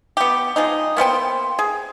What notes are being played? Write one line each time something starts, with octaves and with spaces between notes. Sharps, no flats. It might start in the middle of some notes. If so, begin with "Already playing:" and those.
B3 G4
F3 G#3 D#4
A#3 B3 C5 G5
G#4